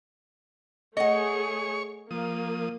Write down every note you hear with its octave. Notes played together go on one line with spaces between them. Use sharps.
A3 G#4 C#5 D#5 F#5 C#6
F3 A#3 D#6